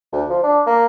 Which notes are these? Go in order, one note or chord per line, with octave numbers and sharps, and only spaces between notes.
D2
F3
D4
A#3